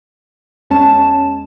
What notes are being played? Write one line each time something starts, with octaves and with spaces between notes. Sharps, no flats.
E2 G#3 C#4 C#5 A5 E7